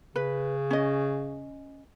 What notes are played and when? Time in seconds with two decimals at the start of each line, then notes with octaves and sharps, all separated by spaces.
0.16 C#3 B4
0.71 C#4 D#5